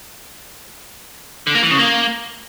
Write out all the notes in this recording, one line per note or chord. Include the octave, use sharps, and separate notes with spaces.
D3
A#3
E3
C#3
A#3